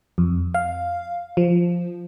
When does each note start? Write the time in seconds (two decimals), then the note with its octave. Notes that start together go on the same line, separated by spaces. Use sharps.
0.18 F2
0.54 F5
1.37 F3